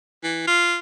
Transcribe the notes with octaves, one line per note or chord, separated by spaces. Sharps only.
E3
F4